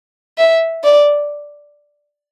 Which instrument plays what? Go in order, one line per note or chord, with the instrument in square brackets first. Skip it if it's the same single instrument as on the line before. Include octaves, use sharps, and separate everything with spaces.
[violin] E5
D5